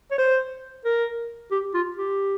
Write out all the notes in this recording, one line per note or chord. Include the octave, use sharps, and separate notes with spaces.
C#5
C5
A#4
G4
F4
G4